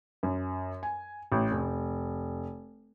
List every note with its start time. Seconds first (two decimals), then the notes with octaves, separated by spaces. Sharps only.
0.23 F#2
0.83 G#5
1.32 A1
1.51 F1